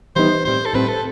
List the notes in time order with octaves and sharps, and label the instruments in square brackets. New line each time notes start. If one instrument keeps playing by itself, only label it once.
[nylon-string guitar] E3 G3 B3 D#4 [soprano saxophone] C5
[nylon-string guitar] A2 G3 C4 [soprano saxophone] C5
[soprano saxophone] A4
[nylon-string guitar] A2 G3 C4 [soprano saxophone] B4
[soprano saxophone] A4